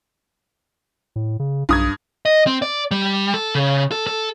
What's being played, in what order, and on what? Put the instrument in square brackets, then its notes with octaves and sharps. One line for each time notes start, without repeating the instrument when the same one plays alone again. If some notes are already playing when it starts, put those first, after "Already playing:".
[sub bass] A2
C#3
[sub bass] B1 [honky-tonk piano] G2 D#6 G#6
[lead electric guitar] D#5
C4
D5
G3
A4
C#3
A4
A4